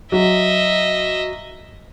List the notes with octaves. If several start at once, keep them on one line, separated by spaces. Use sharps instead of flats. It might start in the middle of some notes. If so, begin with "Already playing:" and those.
F#3 D#5 E5